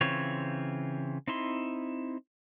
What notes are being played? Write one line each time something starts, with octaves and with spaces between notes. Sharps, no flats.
C#3 E3 C4 F4 C#5
C4 D#4 E4 C6